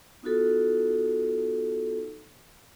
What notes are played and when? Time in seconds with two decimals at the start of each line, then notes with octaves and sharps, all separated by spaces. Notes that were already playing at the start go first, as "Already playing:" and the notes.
0.23 B3 D#4 F4 F#4 A4